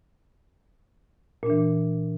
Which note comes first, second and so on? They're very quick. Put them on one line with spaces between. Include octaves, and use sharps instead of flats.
A#2 D4 E3